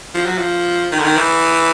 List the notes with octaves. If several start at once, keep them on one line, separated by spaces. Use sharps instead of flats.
F3
F#3
F3
D#3
D3
D#3
E3